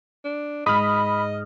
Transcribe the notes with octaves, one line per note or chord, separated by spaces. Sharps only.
D4
G#2 D#5 B5 D#6 F6